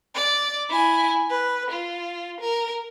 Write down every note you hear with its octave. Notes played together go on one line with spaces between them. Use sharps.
D5
E4 G#5
B4
F4
A#4